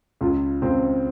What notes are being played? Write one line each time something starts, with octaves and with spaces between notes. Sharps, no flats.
C#2 F4
C#2 C4